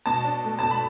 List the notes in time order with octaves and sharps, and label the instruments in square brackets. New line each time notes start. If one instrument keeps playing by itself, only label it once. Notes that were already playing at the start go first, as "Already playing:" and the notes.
[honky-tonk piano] B2 A5
D4
A3
B2 A5
B5